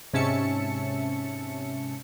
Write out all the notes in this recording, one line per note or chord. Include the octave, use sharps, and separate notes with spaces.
G#2 C3 C#4 E5 A5 C#7